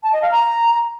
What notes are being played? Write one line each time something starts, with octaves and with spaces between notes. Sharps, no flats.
A5
D#5
F5
A#5